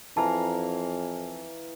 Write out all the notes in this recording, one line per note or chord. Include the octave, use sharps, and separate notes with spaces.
F2 E3 F5 A5 A#5